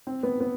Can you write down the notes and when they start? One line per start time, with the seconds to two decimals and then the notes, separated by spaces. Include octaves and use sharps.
0.07 C4
0.23 B3
0.40 B3